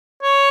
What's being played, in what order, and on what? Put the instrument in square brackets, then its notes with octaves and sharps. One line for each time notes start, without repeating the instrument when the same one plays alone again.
[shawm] C#5